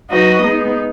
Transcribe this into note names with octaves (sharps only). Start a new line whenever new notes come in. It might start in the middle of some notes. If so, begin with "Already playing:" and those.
F#3 D#4 F#4 B4 D#5
G#3 B3 D#4